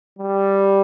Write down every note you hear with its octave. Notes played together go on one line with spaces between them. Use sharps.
G3